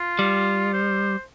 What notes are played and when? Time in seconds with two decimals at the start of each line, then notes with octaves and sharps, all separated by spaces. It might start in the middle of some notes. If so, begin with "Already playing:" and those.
Already playing: F4
0.19 G3
0.73 C5